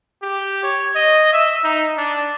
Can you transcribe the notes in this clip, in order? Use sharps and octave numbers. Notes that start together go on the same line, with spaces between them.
G4
C#5
D#5
E5
D#4
D4